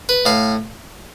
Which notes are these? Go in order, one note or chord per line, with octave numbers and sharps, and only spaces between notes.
B4
A2 F5